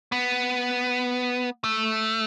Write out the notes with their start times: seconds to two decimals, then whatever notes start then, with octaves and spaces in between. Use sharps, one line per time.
0.12 B3
1.64 A3